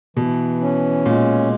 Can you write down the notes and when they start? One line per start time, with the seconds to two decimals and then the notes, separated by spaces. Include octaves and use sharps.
0.17 B2 E3
0.61 C#4
1.06 A#2 G#3